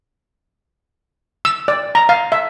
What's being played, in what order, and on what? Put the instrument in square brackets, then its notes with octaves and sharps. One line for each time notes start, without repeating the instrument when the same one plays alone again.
[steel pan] E6
D5
A#5
F5
E5